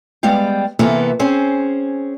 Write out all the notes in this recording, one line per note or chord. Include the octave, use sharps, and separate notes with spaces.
G3 G#3 B3 F5 G5
C3 E3 A#3 B3 E4 A4
C4 C#4 G#4 C5